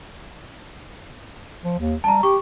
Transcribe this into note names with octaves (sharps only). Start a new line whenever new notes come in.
F3
D#2
G3 A5 A#5
G4 C#6